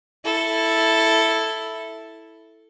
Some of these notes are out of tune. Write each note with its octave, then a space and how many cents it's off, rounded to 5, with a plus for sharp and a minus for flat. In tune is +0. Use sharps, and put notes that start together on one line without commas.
E4 +0 A4 +0